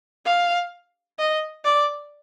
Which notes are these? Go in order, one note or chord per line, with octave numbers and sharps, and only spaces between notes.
F5
D#5
D5